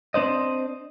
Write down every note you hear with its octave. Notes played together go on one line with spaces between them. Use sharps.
C4 D4 C5 D#5